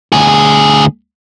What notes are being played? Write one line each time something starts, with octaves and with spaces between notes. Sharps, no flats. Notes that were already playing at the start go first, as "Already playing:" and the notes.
D2 G#4